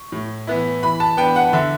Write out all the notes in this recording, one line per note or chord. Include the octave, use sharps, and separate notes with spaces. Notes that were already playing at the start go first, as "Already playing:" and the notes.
Already playing: C#6
A2
E3 B3 E4
E3 B5
A5
B3 D4 G5
F#5
D3 E5